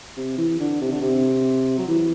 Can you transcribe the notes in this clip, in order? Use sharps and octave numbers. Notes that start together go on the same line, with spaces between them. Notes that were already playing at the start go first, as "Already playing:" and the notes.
C3
E3
D3
C3
D3
C3
F#3
E3